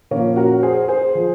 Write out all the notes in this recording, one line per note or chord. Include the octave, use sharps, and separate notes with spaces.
A#2 F3 A#3 C#4
F#4 A#4
G#4 C5
G#4 C5
F3